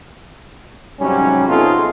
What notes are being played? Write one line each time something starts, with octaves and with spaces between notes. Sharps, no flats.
G#2 C3 F#3 G3 C#4
C3 B3 D#4 F4 G#4 A4